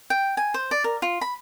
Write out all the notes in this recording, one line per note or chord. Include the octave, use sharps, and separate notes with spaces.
G5
G#5
C5
D5
A#4
F4
B5